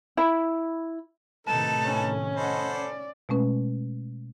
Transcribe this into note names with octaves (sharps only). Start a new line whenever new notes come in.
E4 B5
A2 C3 D#3 D#4 A4 B4 A5
C#4
A4 C5 D#5 F#5 B5
D5
B2 G#3 A3 C#4 B4